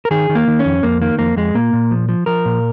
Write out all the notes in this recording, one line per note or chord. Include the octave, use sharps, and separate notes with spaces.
A#4
D#3 G#4
D#3
A#3
D#3
C#4
F2
F2 A#3
D#3 A#3
F2 A#3
F2 G#3
A#2 A#3
A#2
F3
F3
F3 A#4
A#2